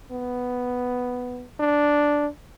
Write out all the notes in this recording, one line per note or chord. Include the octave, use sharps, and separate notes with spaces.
B3
D4